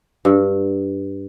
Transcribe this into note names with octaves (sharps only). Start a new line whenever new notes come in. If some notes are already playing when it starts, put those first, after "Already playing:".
G2